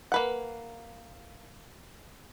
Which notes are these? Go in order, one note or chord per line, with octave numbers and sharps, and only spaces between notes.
A#3 B4 F#5